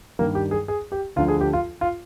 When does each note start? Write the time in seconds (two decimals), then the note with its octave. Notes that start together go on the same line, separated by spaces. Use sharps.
0.19 G2 D#3 G3 A#3
0.35 G4
0.51 G#4
0.68 G#4
0.92 G4
1.16 D2 D3 F3 F4
1.28 G#4
1.41 G4
1.53 F4
1.81 F4